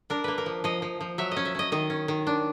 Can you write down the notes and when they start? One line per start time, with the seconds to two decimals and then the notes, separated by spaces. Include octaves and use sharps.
0.10 D4 A#4
0.24 A#3 B4
0.38 A#4
0.46 F3
0.64 F3 D#5
0.82 F3
1.01 F3
1.18 F#3 E5
1.32 C#4 D#5
1.45 E5
1.55 C#4 D#5
1.72 D#3 D#5
1.90 C#4
2.08 D#3
2.27 D4